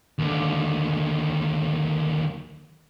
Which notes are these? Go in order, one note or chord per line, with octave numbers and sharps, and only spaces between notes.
D#2 D3